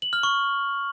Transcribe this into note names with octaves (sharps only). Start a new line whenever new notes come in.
F#7
F6
C#6